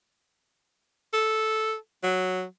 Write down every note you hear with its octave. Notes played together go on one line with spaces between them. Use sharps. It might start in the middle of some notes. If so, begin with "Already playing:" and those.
A4
F#3